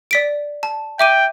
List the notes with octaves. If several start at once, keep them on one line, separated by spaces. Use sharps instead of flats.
D5 B6 D7
A5
E5 G5 D6 D#7